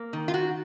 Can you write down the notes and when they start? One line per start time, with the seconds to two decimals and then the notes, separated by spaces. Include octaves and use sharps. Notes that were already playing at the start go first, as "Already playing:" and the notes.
Already playing: A#3
0.13 D#3
0.28 F4
0.34 F#4